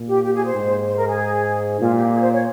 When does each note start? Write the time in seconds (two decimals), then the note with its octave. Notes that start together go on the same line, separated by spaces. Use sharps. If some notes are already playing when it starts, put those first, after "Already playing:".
Already playing: A#2
0.08 G4
0.23 G4
0.34 G#4
0.45 C5
0.55 G#2
0.86 C5
0.97 A#4
1.08 G#4
1.80 A#2 F4
1.96 G4
2.12 G#4
2.22 C5
2.33 C#5